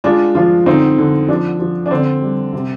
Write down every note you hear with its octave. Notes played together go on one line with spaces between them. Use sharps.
G#3 D4 F4
F3 D4 F4
D3 C4 D#4
D3
F3 D4
F3
D4
D3 C4
G3
C3